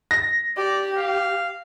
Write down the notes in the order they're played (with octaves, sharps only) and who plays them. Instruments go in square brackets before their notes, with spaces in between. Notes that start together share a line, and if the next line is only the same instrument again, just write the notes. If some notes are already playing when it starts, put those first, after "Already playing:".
[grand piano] A#6
[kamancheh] G4 [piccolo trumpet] D5
[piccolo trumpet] F5